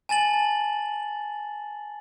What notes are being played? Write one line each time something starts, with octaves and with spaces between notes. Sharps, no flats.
G#5 A5 A6 F#7